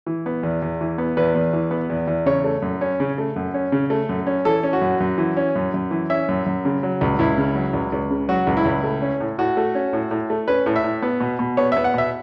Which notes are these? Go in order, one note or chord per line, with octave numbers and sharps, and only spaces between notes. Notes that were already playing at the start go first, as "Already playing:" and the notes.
E3
B3
E2
E2
E3
B3
E2 B4
E2
E3
B3
E2
E2
C#3 C#5
A3
F#2
C#4
C#3
A3
F#2
C#4
C#3
A3
F#2
C#4
E3 A4
C#4
F#4
F#2
F#2
E3
C#4
F#2
F#2
E3
C#4 E5
F#2
F#2
C#3
F#3
C#2
C#2 E4
C#3
F#3
C#2
C#2
C#3
F#3 F#4
C#2
E4
C#2
A3
C#4
A2
A2 F#4
A3
C#4
A2
A2
A3
C#4 B4
A2
E5
A2
B3
B2
B2
B3 C#5
B3 E5
F#5
B2 E5